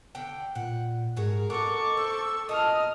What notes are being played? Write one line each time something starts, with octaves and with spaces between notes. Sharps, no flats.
D3 G5
A#2 F#5
G#2 F#4 G#4 A#4
F#4 A4 D#5 C#6 D6
C4 E6
A#2 D#5 A5 D#6 F6